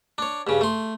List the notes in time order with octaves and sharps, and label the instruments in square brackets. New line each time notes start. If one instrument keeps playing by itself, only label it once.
[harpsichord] D4 C#5
G2 C#3
A3 C6